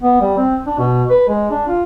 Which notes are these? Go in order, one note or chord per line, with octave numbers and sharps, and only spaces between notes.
B3
G3
C4
D4
B2
B4
G#3
D4
F4